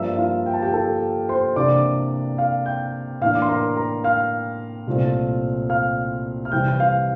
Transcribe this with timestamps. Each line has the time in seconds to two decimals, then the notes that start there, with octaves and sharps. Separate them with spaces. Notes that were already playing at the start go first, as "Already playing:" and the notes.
Already playing: G2 F3 A#3 D4 E5 E6
0.18 F4 F5
0.46 G5
0.54 A5
0.62 G4 G5
0.73 A4 A5
1.29 C5 C6
1.56 C3 E3 A#3 D4 D5 D6
2.38 F5 F6
2.66 G5 G6
3.21 A2 E3 A#3 D4 F5 F6
3.35 D6
3.42 C6
3.49 A#4 A#5
3.77 A#4 A#5
4.04 F5 F6
4.87 C2 A#2 A3 C4
5.70 F5 F6
6.45 F6
6.52 C3 E3 G3 G5 G6
6.68 G6
6.80 F5 F6